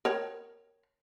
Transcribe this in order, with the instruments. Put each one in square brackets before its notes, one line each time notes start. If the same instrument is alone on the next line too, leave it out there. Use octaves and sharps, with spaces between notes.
[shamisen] A#4 C#5 G5